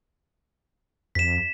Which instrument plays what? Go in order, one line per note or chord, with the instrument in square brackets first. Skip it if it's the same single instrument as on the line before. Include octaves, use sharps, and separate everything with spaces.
[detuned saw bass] F2 [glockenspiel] B6 E7